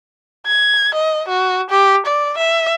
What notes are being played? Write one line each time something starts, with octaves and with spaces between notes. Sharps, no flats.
G#6
D#5
F#4
G4
D5
E5